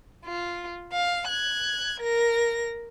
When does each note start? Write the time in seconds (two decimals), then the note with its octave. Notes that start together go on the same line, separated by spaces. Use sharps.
0.26 F4
0.92 F5
1.28 F#6 G#6
2.01 A#4 A#6